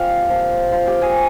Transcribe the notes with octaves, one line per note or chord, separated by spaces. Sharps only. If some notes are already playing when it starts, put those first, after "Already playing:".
Already playing: A#2 G#3 C4 F4 G4 F5 G5
A#2 F3 C4
F4 F5
G4 G5
G#4 G#5